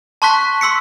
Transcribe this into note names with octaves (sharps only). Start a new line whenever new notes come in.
A5 C6 C#6 F#6 B6
C6 E6 B6 C#7